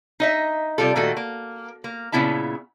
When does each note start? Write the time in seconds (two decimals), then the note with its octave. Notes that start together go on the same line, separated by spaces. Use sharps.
0.20 D#4 D#5 E5
0.78 C3 G3 F4 A4
0.96 A#2 D#3 A3 F#4 A4
1.17 A#3
1.84 A#3
2.12 A#2 C#3 B3 E4 E5 A5